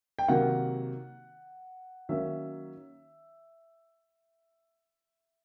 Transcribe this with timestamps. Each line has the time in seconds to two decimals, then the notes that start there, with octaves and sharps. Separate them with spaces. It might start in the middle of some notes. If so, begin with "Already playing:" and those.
0.19 G5
0.28 C3 D#3 F#3 A#3 F#5
2.09 D#3 F#3 A#3 C#4 E5